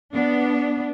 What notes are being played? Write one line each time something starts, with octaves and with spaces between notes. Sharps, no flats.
B3 D4